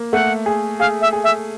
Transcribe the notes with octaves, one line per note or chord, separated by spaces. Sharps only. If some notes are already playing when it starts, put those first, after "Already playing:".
Already playing: A#3
A3 F#5
G#4
G#4 F5
E5
G#4
E5